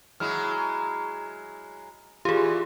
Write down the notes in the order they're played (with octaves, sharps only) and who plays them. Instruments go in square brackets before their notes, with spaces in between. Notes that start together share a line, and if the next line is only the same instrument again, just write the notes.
[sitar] F#3 G#3 E4 [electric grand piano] F6
[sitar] A#2 E3 [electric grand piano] F4 [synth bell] G4 G#4